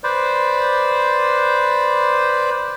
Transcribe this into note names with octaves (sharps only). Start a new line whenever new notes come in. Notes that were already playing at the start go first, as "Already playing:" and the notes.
B4 C5 D5